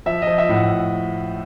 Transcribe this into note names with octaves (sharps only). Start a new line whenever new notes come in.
F3 E5
D#5
F3
E5
A2
F#5